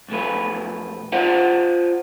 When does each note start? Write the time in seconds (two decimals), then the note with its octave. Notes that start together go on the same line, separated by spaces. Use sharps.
0.08 B1 F2 A3 B4
1.12 F4 C5 D5 F5 F#5